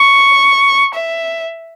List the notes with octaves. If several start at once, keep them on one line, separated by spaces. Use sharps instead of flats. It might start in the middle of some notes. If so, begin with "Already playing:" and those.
Already playing: C#6
E5